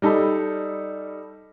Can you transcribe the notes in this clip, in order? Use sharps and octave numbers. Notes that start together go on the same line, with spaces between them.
G3 D#4 A4 B5